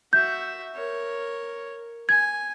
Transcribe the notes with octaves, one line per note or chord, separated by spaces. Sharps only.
F#4 E5 G6
A#4 C#5
G#5 G#6